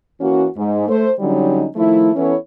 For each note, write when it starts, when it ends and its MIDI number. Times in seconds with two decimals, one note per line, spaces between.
0.21 0.46 52
0.21 0.46 58
0.21 0.46 61
0.21 0.46 66
0.56 0.84 44
0.88 1.08 57
0.88 1.08 72
1.20 1.66 50
1.20 1.66 54
1.20 1.66 55
1.20 1.66 61
1.20 1.66 63
1.76 2.10 51
1.76 2.10 53
1.76 2.10 57
1.76 2.10 64
2.15 2.34 52
2.15 2.34 59
2.15 2.34 61
2.15 2.34 64
2.15 2.34 69
2.15 2.34 73